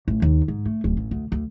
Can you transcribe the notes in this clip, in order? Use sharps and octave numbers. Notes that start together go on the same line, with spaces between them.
A1
D#2
G#2
A3
D1
A1
D2
D2